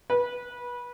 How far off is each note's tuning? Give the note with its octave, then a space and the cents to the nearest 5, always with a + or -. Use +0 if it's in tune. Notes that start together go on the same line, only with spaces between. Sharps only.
B4 -25